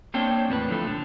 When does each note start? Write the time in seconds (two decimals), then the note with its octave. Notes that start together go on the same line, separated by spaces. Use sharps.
0.14 A#3 C4 D4 C#5 G5
0.49 E2 A2 D4 B4
0.68 D3 F3 A3
0.87 D3